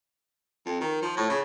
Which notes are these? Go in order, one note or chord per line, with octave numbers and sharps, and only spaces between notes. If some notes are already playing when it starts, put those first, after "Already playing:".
F2
D#3
F3
A2
C#3